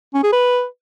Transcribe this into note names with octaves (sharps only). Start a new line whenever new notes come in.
C#4
G#4
B4